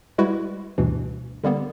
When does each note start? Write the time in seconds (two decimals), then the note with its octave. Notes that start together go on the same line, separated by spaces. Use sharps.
0.18 G3 G#3 E4 F#4 B4
0.78 D2 G2 B2 E3
1.44 D3 G3 A#3 B3